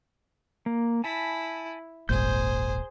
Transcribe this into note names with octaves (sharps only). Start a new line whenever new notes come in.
A#3
E4 G#5 A5 B5
D#1 G#1 A#2 G#4 C5 G6